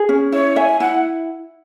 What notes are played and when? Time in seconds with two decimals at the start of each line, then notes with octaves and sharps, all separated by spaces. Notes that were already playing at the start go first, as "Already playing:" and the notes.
Already playing: G#4
0.09 C#4
0.32 E4 C#5
0.56 E5 G#5
0.80 E4 F#5